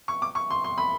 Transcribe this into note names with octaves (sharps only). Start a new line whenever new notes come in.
C#6
D6
C#6
C6
C6
B5